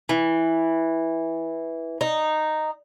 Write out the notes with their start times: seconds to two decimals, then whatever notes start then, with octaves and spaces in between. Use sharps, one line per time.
0.09 E3
2.01 D#4